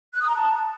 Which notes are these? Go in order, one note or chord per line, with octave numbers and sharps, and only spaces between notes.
F#6
D#6
A#5
A5